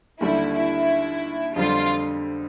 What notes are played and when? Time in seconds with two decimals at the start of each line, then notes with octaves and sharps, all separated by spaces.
0.20 D#2 D3 G3 E4
0.54 E4
1.56 F2 D3 G3 F4